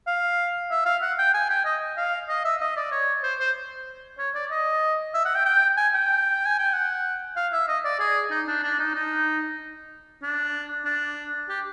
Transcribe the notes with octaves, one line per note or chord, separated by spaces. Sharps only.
F5
E5
F5
F#5
G5
G#5
G5
D#5
F5
D#5
E5
D#5
D5
C#5
C5
C5
C#5
D5
D#5
E5
F#5
G5
G5
G#5
G5
G#5
G5
F#5
F5
E5
D#5
D5
G#4
D#4
D4
D4
D#4
D#4
D4
D4
G4